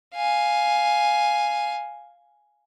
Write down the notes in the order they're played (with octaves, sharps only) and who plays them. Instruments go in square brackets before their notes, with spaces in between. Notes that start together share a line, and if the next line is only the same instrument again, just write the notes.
[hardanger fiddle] F5 G#5